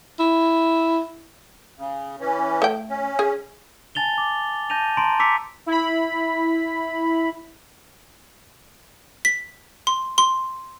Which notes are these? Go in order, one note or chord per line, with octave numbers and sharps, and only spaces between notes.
E4
C#3
E3 C#4
A3 G5
C#4
G#4
G#5 A5 A6 F7 G7
D6
A5 G6 A#6 D#7 F7
A5 A#5 C6 D7
A#5 D6 E6 B6 C#7 F7
E4 B5
B6
C6
C6